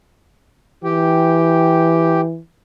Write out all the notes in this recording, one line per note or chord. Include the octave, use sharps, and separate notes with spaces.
E3 G4 G5